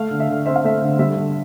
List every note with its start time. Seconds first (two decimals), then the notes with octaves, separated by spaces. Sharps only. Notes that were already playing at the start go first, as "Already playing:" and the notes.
Already playing: A3 F5
0.11 D3
0.20 E5
0.28 D3
0.46 C4 E5
0.56 F5
0.64 A3 E5
0.82 D3
0.99 G3 E5
1.17 D3